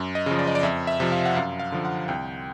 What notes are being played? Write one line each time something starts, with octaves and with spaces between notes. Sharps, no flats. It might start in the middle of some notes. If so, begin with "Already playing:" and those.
Already playing: F#2
D#5
C#3 F3
D5
D#5
D5
F2 E5
E5
C3 F3
F5
F#5
F#2 F5
F5
D3 F3
F#5
C2 G5